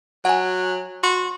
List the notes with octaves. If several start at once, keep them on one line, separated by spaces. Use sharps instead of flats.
F#3 F#5 G#5
F#4 C6